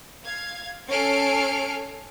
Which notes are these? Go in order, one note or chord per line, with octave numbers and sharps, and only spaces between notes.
F5 G#6
C#4 A4 G#5 F6 C7 D7